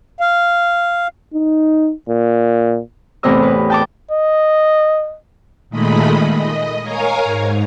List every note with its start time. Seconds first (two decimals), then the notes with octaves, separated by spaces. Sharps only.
0.20 F5
1.34 D#4
2.09 A#2
3.23 E2 A2 C3 C4 D#5 E6
3.43 B4
3.70 G5 A5 D6
4.11 D#5
5.70 A#2 D#3 G#3 A3 D#5 B5
6.34 D#5
6.83 A#4 C#5 F5 G#5 A#5
7.23 G#2